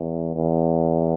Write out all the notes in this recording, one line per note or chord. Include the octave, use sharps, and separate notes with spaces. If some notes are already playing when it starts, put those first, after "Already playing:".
Already playing: E2
E2